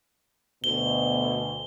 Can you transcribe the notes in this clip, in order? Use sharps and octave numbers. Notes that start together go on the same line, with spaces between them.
D2 B2 G7